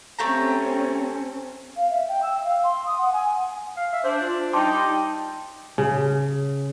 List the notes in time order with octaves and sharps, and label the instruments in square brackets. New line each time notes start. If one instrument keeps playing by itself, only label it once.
[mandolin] A3 G4 A#5 [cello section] C4 C#4
[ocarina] F5
E5
G5
E6
F5
C6
D#6
F#5
G#5
[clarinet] F5
E5
[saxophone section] D4 [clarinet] C5
[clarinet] F4
[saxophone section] G3 D#4 [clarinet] G5 [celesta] A5 C6 D6
[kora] C#3